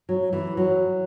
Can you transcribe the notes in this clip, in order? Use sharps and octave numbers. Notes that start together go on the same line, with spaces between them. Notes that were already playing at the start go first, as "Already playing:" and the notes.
F#3
E3
F#3